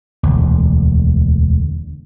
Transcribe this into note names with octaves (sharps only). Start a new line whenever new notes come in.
E1 D2